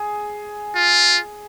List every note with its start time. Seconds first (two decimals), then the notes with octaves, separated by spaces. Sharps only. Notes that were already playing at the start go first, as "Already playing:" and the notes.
Already playing: G#4
0.75 F4